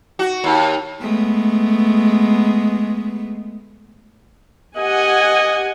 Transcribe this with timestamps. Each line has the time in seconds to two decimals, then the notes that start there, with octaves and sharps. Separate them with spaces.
0.19 F#4
0.44 D#2
1.02 G#3 A3 B3
4.77 G4 D#5 F#5 G#5